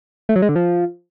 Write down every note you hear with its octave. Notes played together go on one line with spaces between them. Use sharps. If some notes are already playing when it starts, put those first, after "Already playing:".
A3
F#3
G#3
D3
F3